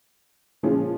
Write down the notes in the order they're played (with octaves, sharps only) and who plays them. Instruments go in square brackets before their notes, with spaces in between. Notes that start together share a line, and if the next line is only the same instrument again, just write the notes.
[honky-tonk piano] A#2 F3 G#3 C#4 F4